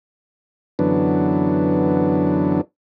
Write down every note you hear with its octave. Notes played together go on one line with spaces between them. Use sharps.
F#2 D3 E3 F#3 B3 D4